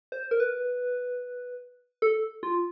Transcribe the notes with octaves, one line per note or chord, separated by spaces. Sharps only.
C5
A#4
B4
A4
F4